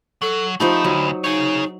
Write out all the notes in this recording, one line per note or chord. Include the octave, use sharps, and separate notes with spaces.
F#3 A4
F3 A3 D#4 G4 B5
D2 F#3
D#4 G#4 C#5